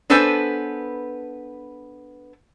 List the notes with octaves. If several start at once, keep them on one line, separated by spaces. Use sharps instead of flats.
B3 D4 A4 B4 C5 G#5